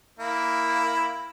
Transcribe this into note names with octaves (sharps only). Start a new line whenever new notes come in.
A#3 E4